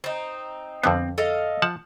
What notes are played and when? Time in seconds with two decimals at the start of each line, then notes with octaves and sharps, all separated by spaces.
0.04 C4 D#4
0.84 F2 D3 B3 C4
1.18 A4 D#5 F5
1.62 F3 F#5 A5